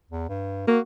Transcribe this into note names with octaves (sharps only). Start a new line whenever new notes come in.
E2
G2
A#3 F#4